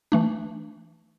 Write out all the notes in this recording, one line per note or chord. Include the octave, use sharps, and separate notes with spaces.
E3 A3 D4